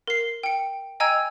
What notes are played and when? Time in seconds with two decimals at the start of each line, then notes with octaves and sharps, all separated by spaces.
0.07 A#4 C7
0.43 G5 C#7
1.00 D#5 G5 G#5 A#5 E6 G#6